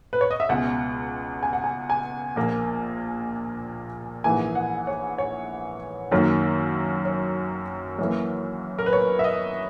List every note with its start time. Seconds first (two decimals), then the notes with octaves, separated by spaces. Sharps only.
0.13 B4
0.21 C#5
0.31 D#5
0.40 E5
0.49 C#2 B2 G#3 F#5
1.43 G#5
1.53 F#5
1.64 G#5
1.90 G#5
2.36 A#1 A#2 A#3
4.24 A#1 G#2 E3 A#3 G#5
4.55 F#5
4.87 C#5
5.18 C#5
6.11 F#2 D#3 F#3 A#3
7.05 C#5
7.99 F#2 E3 A#3
8.79 A#4
8.86 B4
8.93 C#5
9.19 E5
9.24 D#5